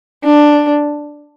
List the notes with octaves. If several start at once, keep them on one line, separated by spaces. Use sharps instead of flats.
D4